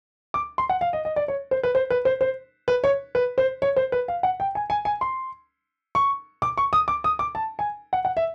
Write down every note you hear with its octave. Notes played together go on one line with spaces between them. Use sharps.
D6
C6
F#5
F5
D#5
D#5
D5
C#5
C5
B4
C5
B4
C5
C5
B4
C#5
B4
C5
C#5
C5
B4
F5
F#5
G5
G#5
G#5
G#5
C6
C#6
D6
C#6
D#6
D6
D#6
D6
A5
G#5
F#5
F#5
E5